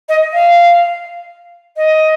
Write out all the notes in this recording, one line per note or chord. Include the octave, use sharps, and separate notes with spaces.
D#5
F5
D#5